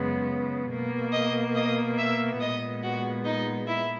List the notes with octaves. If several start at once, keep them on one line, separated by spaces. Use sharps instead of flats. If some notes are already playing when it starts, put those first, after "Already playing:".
Already playing: F#2 C#3 G#3 B3
B2 A#3
D#5 D#6
D#5 D#6
E5 E6
A#2 G#3 B3 D#5 D#6
F#4 F#5
D#4 D#5
E4 E5